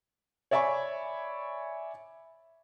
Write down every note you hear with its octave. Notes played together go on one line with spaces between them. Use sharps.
C#5 D5 E5 G#5 B5 C#6